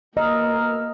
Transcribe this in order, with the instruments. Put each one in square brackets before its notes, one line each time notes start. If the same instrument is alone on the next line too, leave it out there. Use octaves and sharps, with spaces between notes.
[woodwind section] B2 E6 F6 [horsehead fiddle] A#3 [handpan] D#5 [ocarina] A#5